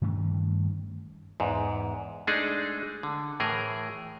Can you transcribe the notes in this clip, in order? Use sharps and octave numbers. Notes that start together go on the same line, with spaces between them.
G2 D#3 A3 C#4
E2 G#2
G#3 A3 D4 D#4 G#4
D3
A2 E3 G#4 A#4